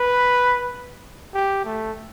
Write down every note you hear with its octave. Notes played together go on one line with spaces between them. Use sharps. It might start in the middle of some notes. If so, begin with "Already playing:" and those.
Already playing: B4
G4
A3